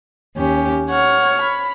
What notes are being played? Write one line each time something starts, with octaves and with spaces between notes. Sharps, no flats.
D#2 C#4 G4
C#5 F#5 F6
B5